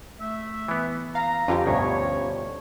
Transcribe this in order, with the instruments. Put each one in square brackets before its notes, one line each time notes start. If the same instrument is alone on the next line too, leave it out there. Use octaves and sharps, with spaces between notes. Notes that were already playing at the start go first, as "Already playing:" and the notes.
[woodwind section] A3 E5
[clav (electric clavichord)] E3 B3
[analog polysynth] F5 [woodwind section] A#5
[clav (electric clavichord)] F2 D3 [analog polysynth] C#4 F4 G4
[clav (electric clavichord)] D2 G2 B2 [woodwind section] C#5